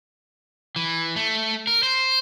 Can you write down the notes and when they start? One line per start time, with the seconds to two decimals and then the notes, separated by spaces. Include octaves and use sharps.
0.76 E3
1.16 A3
1.67 A#4
1.83 C5